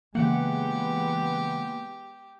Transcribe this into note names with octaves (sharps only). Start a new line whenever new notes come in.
C#3 E3 G#3 A#3 B3 G4 F#5